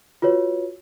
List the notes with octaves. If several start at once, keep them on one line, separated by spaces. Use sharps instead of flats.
F4 F#4 B4 C#5